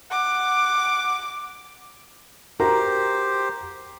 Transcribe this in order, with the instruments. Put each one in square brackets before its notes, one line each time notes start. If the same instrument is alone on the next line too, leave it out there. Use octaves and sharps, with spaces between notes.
[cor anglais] F#5 [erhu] D6
[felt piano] F#4 A#4 A#5 [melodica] G4 C5